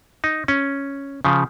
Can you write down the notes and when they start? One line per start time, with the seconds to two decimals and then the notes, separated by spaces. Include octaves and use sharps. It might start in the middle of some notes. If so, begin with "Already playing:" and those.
0.24 D#4
0.48 C#4
1.25 C#3 F3